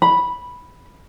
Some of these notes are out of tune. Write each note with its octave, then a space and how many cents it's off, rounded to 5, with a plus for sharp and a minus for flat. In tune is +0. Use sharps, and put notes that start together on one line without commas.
B5 -5